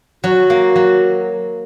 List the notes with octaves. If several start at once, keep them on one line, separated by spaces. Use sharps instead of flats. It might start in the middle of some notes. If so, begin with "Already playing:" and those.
F#3 F#4
A#3
F#3